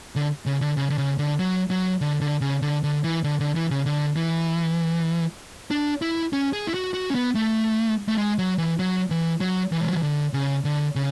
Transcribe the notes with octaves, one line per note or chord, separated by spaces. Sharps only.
D3
C#3
D3
C#3
D3
C#3
D3
F#3
F#3
D3
D3
C#3
D3
D3
E3
D3
D3
E3
C#3
D3
E3
D4
E4
C#4
G#4
E4
F#4
F#4
C#4
B3
A3
A3
G#3
F#3
E3
F#3
E3
F#3
E3
G#3
F#3
E3
D3
C#3
D3
C#3